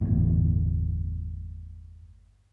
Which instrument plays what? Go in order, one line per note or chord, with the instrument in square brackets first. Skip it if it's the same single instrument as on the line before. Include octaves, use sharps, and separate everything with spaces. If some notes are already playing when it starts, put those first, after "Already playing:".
[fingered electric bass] G1 E2 A2